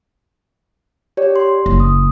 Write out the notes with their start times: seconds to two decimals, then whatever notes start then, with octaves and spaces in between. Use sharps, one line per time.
1.17 G4 C#5 D5
1.36 C6
1.66 F#1
1.80 D#6